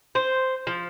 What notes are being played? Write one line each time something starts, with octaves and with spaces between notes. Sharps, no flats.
C5
F3